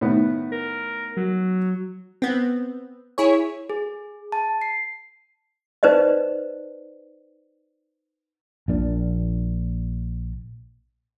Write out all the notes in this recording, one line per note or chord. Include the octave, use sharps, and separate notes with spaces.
A2 D#3 B3
A#4
F#3
B3 C4
E4 G#4 C#5
G#4
A5
C7
D#4 B4 C5 D5 D#5
A#1 A#2 D4